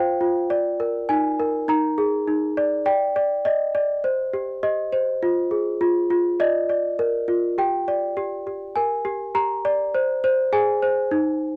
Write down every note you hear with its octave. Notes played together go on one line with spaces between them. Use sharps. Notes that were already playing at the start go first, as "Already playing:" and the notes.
Already playing: F4 C5 F5 G5
F4
D5
A#4
D#4 G#5
A#4
D#4 A#5
G#4
D#4
D5
D5 G5
D5
D5 D#5
D5
C5
G4
G4 D#5
C5
F4
G#4
F4
F4
D5 D#5
D5
A#4
F4
G4 G5
D5
G4
G4
A#4 G#5
G4
G4 A#5
D5
C5
C5
G#4 G#5
C5
D#4